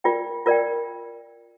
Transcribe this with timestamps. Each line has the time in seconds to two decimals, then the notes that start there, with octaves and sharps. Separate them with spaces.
0.04 F4 A#4 D5 G5
0.46 F4 A#4 D5 G5